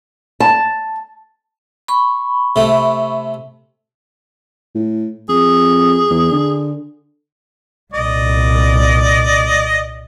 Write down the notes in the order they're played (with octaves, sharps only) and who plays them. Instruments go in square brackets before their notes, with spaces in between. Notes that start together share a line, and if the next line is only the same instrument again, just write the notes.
[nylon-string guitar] A5
[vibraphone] B5 C#6
[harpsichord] C3 A3
[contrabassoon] A2
[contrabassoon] F2 [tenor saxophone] G#4
[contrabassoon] E2
D3
[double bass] C2 A#2 [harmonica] D5 D#5